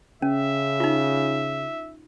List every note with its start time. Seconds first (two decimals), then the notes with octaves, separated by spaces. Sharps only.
0.22 C#3 C#4 E5
0.80 D#4 F4